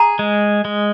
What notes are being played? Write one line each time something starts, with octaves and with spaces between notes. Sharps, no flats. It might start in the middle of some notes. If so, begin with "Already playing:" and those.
Already playing: G#4 A#5
G#3
G#3